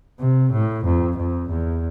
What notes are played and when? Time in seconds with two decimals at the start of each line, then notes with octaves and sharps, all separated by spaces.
0.20 C3
0.52 A2
0.85 F2
1.17 F2
1.50 E2